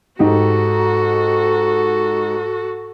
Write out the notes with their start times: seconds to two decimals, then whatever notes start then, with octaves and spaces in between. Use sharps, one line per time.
0.19 G#2 D#4 F#4 G4 A4